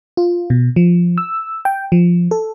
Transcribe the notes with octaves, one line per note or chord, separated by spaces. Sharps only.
F4
B2
F3
E6
G5
F3
A4